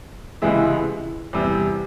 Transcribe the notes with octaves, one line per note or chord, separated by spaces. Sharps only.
C#2 C3 E3 G#3 E4
E2 C3 G3